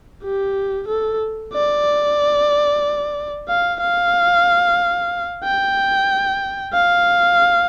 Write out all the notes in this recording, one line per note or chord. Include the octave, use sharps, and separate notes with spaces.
G4
A4
D5
F5
F5
G5
F5